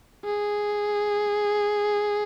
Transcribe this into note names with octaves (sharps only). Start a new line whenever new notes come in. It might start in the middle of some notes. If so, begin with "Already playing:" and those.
G#4